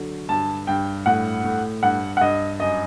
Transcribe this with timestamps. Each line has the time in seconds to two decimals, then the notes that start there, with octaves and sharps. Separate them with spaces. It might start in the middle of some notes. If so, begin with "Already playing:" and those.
Already playing: D3 F#3
0.29 G2 A5
0.67 G2 G5
1.06 A2 F#5
1.44 A2
1.83 G2 F#5
2.17 F#5
2.21 G2 D#5
2.60 F#2 D#5